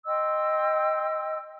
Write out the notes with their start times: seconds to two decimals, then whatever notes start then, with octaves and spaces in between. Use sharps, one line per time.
0.06 D#5 G5 C6 E6